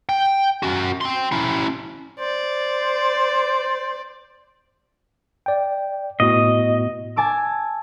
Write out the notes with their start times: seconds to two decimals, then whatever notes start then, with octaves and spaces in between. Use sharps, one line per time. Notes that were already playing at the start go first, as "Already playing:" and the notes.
0.09 G5
0.63 C#4 F#4
1.01 G5 C6
1.32 C#4 E4
2.19 C5 D5
5.46 D5 G5
6.20 A2 B3 F#4 D#5
7.16 G#5 A5 D6 E6